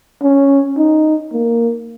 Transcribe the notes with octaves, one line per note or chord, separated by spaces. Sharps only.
C#4
D#4
A#3